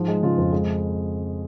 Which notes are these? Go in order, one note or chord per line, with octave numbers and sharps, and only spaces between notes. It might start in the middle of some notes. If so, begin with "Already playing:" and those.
Already playing: G#2 F3
G#3
C#3 F4
F2
G#3